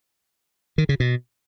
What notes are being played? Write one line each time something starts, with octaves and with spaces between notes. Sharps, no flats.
D#3
C#3
B2